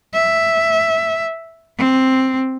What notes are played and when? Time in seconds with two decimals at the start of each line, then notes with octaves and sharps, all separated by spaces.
0.13 E5
1.78 C4